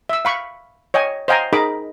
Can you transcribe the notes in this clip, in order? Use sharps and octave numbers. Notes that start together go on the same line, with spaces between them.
E5 E6
F5 B5 C#6
C#5 D#5 G5 G#5
C5 D#5 F5 G5 G#5 A#5
D#4 G#4 A#4 D#5 B5 D6